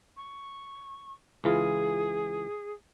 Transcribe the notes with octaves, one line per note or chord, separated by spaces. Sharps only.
C#6
C#2 E3 F4 G#4